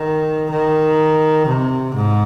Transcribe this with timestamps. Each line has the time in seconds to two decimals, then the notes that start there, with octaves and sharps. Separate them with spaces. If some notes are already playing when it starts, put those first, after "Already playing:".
Already playing: D#3
0.50 D#3
1.47 C3
1.95 G#2